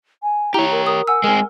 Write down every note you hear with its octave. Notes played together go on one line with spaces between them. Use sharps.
G#5
E4 G4 C#5 A#5
A#4
A#4 D#6
F#5 G#5 E6
G#3 C4 A#4 G#5